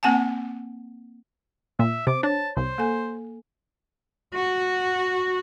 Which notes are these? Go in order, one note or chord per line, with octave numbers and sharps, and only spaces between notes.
A#3 C4 F#5 G#5 A5
A#2 E5
C3 C5 D6
D4 C#5 A5
C2 C5
A#3 A4 G#5
F#4